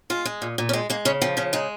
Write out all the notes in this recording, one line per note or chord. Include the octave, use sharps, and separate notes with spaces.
G#3 F4
G#3
A#2
A#2
C#4
G#3 C4
G#3 A#3
C#3 C#4
F3 C4
C#3 C#4
G#3 D#4